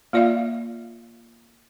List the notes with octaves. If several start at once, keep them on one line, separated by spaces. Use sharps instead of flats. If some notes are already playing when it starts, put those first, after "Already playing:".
A#3 F4 D5 E5 F5